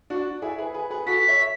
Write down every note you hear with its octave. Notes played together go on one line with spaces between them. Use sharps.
D4 F#4
E4 G#4
G#4 B4
G#4 B4
G#4 B4
F#4 A4 B6
C#5 E5